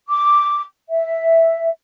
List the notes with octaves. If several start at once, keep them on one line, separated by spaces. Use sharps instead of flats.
D6
E5